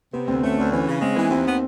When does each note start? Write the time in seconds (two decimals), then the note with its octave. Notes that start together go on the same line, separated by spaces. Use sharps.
0.13 C3 B3
0.28 D2 C4
0.43 A3 C#4
0.58 D2 D4
0.72 E3 C#4
0.87 C#3
1.01 G#3 C4
1.16 E3 B3
1.31 D#2 C4
1.46 B3